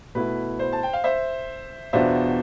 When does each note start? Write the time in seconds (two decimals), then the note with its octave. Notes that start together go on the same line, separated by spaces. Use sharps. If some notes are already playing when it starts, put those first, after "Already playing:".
0.15 B2 A3 E4 B4
0.59 C5
0.73 A5
0.83 G5
0.93 F5
1.04 C5 E5
1.93 E2 B2 B3 D4 F4 C5 E5